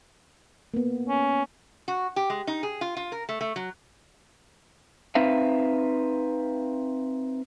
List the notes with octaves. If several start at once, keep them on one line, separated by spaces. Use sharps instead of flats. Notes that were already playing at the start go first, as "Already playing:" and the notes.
A#3 B3
C#4
F#4
G4
G#3
D#4
G#4
F4
F4
A#4
A3
A3
F#3
C4 D#4 B4 E5 F5